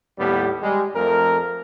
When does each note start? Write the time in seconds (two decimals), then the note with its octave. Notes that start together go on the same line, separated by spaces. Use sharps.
0.18 D#2 A2 G3 B3
0.62 G3 G#3
0.95 F2 A3 A#4